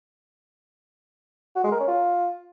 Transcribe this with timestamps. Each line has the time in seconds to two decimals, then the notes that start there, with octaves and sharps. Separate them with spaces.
1.56 F#4
1.64 G#3
1.72 A#4
1.80 C#4
1.88 F4